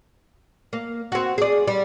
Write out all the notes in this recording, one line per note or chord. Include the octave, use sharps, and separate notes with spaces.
A#3
C4 F#4
G#4 D5
G3